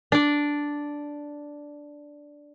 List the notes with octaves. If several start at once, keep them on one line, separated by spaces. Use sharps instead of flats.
D4 D5